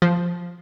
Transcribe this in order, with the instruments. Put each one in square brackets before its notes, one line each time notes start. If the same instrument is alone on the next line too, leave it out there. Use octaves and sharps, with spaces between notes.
[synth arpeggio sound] F3